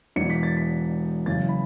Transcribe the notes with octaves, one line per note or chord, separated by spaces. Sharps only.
E1 E2 E3 C#7
B6
A6
B6
F#1 F#2 C#3 E3 A6
B5